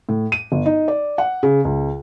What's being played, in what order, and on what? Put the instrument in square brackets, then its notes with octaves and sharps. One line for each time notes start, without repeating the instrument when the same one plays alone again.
[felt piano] A2
D#7
G1
D#4
D5
F#5
C#3
C#2